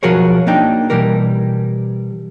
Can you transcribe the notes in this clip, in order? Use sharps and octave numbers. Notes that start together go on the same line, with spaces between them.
B1 F3 F#4 G#4 A#4 C#5
A#3 D4 D#4 G5
B2 E3 G3 G4 A#4